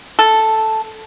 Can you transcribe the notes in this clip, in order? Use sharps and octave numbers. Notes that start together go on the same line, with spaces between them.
A4